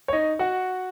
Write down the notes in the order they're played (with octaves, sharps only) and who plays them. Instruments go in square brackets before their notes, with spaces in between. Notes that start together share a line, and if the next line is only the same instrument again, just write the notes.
[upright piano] C#5
D#4 D#5
F#4 F#5